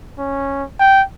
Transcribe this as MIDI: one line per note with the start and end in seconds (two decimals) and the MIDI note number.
0.18 0.64 61
0.80 1.03 79